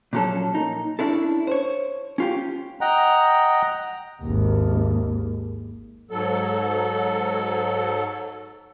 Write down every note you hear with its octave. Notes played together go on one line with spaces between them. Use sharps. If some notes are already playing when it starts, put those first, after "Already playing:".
A#2 F3 F#3 C#4 A4
A#2 D#4
C#4 D4 E4 A4
C5 C#5
C#4 F4 G4
D#5 F#5 G5 A#5
G#1 D#2
G#2 F#3 A4